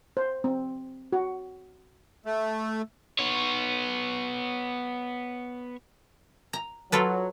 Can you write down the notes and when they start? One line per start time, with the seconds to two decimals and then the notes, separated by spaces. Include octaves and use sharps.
0.17 C5
0.44 C4
1.12 F#4
2.26 A3
3.19 B3 C#5
6.53 A#5
6.92 F#3 F4 A4 B4